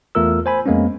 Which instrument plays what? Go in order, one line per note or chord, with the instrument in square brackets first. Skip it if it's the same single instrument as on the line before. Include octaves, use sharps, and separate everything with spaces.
[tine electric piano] E2 A3 F4 A#4 E6
C5 G#5 B5
F2 G#3 A#3 B3 C#4